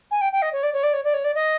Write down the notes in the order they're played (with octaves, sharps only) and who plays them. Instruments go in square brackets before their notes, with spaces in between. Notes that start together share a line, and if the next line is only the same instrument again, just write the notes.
[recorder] G#5
G5
G5
D#5
C#5
D5
C#5
D5
C#5
D5
C#5
D5
D#5